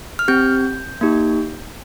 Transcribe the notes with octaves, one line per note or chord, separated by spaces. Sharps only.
F6
C4 G4 G6
A#3 D#4 G4